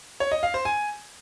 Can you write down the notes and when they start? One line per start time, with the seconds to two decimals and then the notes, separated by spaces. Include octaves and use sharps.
0.20 C#5
0.32 D#5
0.43 F5
0.54 C5
0.65 G#5